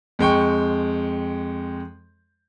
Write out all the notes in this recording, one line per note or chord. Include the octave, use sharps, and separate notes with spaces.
F2 G#3 G5 C#6